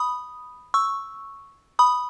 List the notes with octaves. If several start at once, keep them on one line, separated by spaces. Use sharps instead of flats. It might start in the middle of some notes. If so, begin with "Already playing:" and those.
Already playing: B5 D#6
C#6 E6
B5 D#6